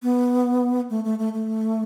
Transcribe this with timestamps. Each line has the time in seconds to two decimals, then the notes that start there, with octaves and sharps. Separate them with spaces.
0.03 B3
0.90 A3
1.04 A3
1.19 A3
1.33 A3